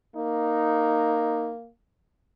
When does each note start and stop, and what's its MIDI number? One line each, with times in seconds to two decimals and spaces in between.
0.16 1.69 58
0.16 1.53 63